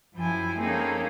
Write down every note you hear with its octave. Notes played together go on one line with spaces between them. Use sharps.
F#2 F3 E4 G5 G#5
A#3 C4 C#4 D#4 G#4 A4